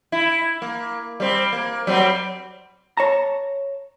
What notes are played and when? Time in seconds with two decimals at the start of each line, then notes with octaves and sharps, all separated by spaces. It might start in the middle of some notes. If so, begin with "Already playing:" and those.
0.12 E4
0.62 A#3
1.20 G3 C4
1.53 A#3
1.87 F#3 G3 C4
2.97 C#5 A5 A#5